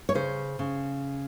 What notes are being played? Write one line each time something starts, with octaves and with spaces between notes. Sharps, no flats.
C#5
C#3 C5
C#3